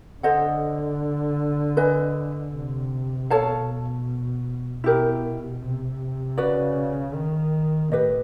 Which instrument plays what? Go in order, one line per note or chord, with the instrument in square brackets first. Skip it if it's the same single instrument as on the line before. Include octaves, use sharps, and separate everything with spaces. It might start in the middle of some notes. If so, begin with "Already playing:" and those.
[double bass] D3 [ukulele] A4 C5 D#5 F#5
[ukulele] B4 D#5 G#5
[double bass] C3
[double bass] B2 [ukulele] A4 C#5 F5 A5
[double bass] B2 [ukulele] E4 G4 A#4
[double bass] C3
[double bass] C#3 [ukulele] F#4 B4 D5
[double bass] D#3
[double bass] A2 [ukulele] G4 B4 D#5